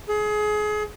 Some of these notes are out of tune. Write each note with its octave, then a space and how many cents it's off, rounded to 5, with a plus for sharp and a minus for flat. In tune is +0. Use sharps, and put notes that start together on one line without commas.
G#4 +25